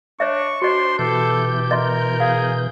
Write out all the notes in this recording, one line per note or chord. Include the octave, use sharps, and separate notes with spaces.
D4 C#5 D#5 E5 C#6
D4 F#4 C5 D#5 C6
B2 E3 G4 A4 G6
A#4 D#5 E5 C6
G#4 F5